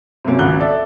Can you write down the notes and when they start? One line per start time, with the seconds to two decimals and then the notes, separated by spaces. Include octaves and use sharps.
0.25 C3 F#3 A3 A#3 C#4
0.39 G#1 C#2 F#4 F#6 G7
0.60 A4 D5 E5